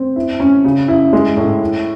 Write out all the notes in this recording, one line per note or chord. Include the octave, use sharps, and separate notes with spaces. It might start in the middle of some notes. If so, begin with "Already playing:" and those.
Already playing: C4
E4
C#4
C#3
E4
G#3
A2
E4